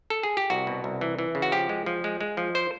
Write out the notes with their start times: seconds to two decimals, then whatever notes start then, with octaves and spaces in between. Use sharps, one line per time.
0.10 A4
0.23 G#4
0.37 G4
0.50 C2 F#4
0.67 B2
0.84 C2
1.01 E3
1.19 E3
1.35 C#3
1.42 F#4
1.52 F3 G4
1.69 G#3
1.86 F3
2.04 G#3
2.21 G#3
2.37 F3
2.55 C5